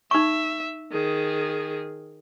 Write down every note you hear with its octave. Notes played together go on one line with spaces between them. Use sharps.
D#4 E5 C#6
D#3 G#4